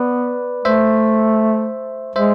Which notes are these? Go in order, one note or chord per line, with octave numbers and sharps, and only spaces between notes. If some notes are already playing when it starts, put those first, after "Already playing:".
Already playing: B3 B4 D5
A3 C5 E5
G#3 C5 E5